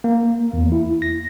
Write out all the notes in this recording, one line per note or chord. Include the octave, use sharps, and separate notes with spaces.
A#3
E2
E4
A#6